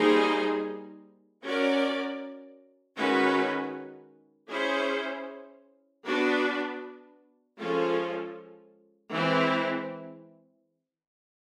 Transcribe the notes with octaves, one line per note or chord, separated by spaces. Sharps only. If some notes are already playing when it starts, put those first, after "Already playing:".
Already playing: G3 A#3 D#4 G#4 C5
C#4 F#4 A#4 D5
D#3 G#3 C#4 F#4 B4
C#4 E4 G#4 C5
B3 D4 F#4 B4
F3 G#3 C#4 F4 A4
E3 G#3 C4 E4